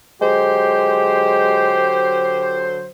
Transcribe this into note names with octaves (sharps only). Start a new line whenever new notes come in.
D3 F#3 G#3 G4 C5